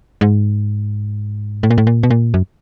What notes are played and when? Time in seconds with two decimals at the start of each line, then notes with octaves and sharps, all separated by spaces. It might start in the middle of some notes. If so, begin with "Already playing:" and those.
0.21 G#2
1.63 A2
1.70 A#2
1.78 A2
1.87 A#2
2.03 B2
2.10 A#2
2.34 F#2